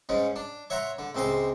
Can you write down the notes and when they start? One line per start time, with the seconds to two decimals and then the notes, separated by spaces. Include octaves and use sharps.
0.09 G#2 G#3 C#4
0.36 D4
0.70 C#5 E5 F#5 A#5 C6
0.99 D3
1.15 C#2 C3 G#3 C4 C6